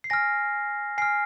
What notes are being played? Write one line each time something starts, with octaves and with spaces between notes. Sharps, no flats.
C7
G#5 F6 A#6
G#5 F6 C7